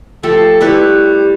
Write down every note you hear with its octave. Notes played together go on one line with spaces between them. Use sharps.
F3 A3 G4 A4
G3 E4 B4 C#5